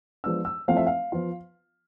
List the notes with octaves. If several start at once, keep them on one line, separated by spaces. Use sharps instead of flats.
F3 G#3 B3 D4 E6
E6
F3 A3 C4 E4 F5
E5
F5
F3 B3 F4